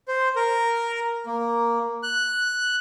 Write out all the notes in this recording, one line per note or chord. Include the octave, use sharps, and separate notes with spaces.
C5
A#4
A#3
F#6